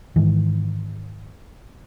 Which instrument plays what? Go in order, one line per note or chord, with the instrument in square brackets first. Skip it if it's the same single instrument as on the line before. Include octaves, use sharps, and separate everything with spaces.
[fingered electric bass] G#2 D#3 E3